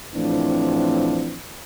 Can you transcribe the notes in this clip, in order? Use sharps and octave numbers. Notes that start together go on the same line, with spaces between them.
A2 E3 F3 C4 D4